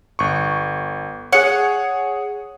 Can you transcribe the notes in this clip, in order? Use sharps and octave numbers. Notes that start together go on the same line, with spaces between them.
G1 C#6
G#4 C#5 F#5